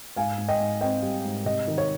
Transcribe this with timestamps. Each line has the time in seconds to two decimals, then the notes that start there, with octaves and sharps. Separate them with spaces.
0.16 G#2 F5 G#5
0.38 G#2
0.48 D#5 G5
0.60 G#2
0.81 C4 D#5 G5
1.02 G3
1.25 G#2
1.45 C3 D#5
1.67 D#3
1.78 C#5